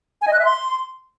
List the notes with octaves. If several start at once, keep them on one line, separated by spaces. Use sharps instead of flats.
G#5
D#5
F#6
E5
C6